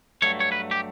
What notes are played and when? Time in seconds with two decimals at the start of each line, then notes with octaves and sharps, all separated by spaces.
0.22 G2 F#3 A3 C#5
0.40 C#5
0.52 B4
0.71 G4